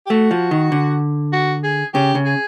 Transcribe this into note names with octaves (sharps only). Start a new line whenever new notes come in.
G4
A3 F#4
F3
D#3
D3
F#4
G#4
C#3 G4
C#3
G#4